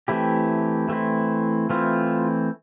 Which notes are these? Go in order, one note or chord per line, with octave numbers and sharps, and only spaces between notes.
E3 A3 C4 E4 G4
E3 A3 C4 E4
E3 A3 C4 E4 F4